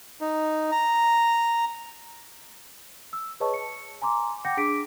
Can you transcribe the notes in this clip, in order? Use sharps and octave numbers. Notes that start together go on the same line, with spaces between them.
D#4
A#5
E6
G#4 B4 C#5 D#5 A5 C#6
C#7
G#5 A#5 C6 D6
F#5 G5 D6 G6 A#6 C#7
D4 G#4 D6 B6 D7